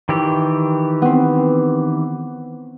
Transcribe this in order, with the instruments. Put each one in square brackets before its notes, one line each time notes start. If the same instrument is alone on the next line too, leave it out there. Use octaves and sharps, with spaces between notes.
[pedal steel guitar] D#3 E3 G4
[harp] B3 C4